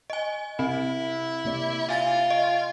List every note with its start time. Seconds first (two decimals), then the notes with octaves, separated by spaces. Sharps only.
0.10 D#5 G#5
0.59 C3 C4 E4
1.45 C3 A#3 D5
1.89 F4 E5 G#5 A6
2.30 D#5